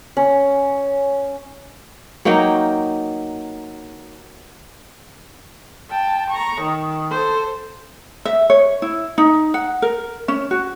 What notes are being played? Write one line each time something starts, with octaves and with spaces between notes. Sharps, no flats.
C#4
F#3 A#3 D#4 G5
G5 A5
A#5 C#6
D#3
A4 C5
E5
C#5
E4
D#4
F#5
A#4
C#4
F#4